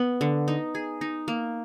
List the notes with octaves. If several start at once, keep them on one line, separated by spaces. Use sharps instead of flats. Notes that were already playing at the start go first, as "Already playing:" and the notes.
Already playing: B3
D3
D#4
G#4
D#4
A#3